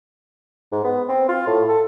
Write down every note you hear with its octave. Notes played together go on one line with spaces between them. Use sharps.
G#2
B3
C4
F4
A2
A4